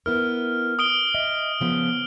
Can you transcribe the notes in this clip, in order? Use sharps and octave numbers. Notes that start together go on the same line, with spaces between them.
B3 E4 A#4 F6
D#6 D7 G7
D#5 E5
C#3 F3 B3